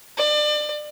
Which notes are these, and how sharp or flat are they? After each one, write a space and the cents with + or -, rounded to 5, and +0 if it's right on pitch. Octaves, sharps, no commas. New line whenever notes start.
D5 +30